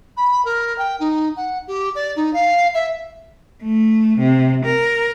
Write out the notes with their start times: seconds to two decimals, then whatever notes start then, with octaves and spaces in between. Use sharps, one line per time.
0.17 B5
0.45 A#4
0.78 G5
0.99 D#4
1.36 F#5
1.67 G4
1.95 D5
2.16 D#4
2.33 F5
2.74 E5
3.63 A3
4.19 C3
4.65 A#4